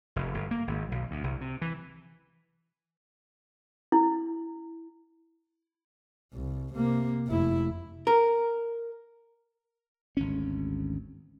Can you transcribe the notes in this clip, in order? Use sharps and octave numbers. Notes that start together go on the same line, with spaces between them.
F1
G1
A#3
G#1
B1
D2
C2
C3
E3
E4
C2
C3 A#3
F1 E4
A#4
G#1 D2 C#4